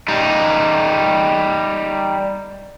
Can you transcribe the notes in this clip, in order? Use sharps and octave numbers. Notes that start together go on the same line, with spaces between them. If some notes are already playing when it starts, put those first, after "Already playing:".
G3 D#4